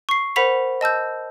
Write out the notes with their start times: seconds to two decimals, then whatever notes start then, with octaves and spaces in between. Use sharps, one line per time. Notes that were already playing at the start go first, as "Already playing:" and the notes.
0.09 C#6 C7
0.36 A#4 C5 F#5 B5 B6 F7
0.81 D#5 A5 E6 G6